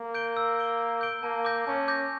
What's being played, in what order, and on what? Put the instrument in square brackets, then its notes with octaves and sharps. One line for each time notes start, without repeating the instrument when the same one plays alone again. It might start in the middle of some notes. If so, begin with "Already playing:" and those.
Already playing: [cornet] A#3
[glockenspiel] G6 D7 G7
E6
G6 D7 G7
E6
G6 D7 G7
[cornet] A#3 [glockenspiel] A5
[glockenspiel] D6 G6 A#6
[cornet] C#4 [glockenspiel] A5
[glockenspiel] D6 G6 A#6